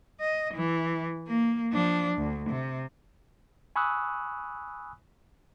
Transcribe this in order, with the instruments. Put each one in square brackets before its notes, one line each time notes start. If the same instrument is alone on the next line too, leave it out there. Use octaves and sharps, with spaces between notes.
[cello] D#5
E3
A#3
F3 D4
D2
C3
[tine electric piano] G#5 B5 C#6 D#6 E6 F#6